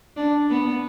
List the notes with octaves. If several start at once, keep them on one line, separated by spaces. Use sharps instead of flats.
D4
B3